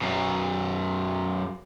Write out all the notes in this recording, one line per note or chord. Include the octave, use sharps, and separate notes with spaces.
F#2 B2